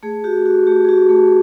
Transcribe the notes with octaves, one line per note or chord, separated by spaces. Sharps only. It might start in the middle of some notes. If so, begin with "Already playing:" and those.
A3 G#4
F#4 G4
F#4
A3 G4
G#4
F#4 G4
A3